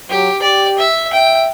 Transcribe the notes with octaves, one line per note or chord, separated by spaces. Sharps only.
F#3 G4
G4 D5
E5
E5 G5